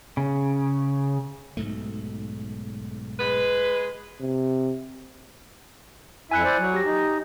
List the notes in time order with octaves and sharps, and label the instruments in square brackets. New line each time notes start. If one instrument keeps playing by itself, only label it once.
[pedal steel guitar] C#3
[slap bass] B1 G#2 A3
[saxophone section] G#3 B4
[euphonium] C3
[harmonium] F2 E4 E5 [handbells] G#5 F#6 C#7
[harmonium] E4 C5 D5
F#3
[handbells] G4 A#6
[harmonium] D#4